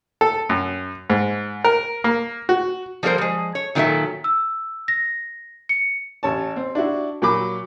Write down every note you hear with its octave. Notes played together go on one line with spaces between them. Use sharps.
A4
F#2
G#2
A#4
A#3
F#4
F3 G3 A#3 A#4 C5
F3 G#3
C#5
A#2 D#3 F#3 D#4 A4 E5
E6
A#6
C#7
A1 C#5 A5
C4
D4 E4 F#4
A#2 F#3 B5 D6